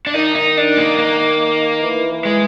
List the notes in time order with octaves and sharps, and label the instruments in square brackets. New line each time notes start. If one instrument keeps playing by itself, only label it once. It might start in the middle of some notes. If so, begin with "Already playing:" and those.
[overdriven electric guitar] D4
[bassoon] D#3 [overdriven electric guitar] D#4
[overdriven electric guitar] D#4
D4
A#3
A#3
[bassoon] E3
E3
[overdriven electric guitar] G#3